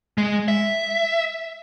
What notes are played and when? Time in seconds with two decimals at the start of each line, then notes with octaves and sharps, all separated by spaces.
0.18 G#3
0.48 E5